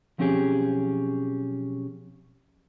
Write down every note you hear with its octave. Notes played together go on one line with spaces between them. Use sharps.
B1 F3 C4 C#4 G4 G#4